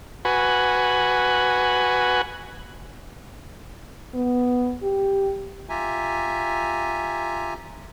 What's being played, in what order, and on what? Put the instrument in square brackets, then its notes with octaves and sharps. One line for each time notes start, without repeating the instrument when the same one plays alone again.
[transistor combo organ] F#4 B4 G#5
[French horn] B3
G4
[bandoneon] F4 G4 E5 G#5 A#5